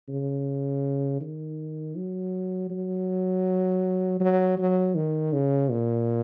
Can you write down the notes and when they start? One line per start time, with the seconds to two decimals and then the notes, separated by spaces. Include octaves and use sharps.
0.09 C#3
1.21 D#3
1.97 F#3
2.70 F#3
4.20 F#3
4.58 F#3
4.95 D#3
5.33 C#3
5.71 A#2